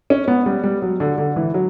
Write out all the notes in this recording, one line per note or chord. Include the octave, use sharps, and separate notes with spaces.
C#4
B3
G3
G3
F#3
D3
D3
E3
F#3